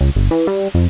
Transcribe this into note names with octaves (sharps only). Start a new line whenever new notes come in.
C#2
G1
E3
G3
F2